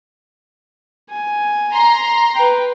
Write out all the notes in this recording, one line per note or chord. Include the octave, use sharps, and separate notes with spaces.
G#5
A#5 C6
B4 G5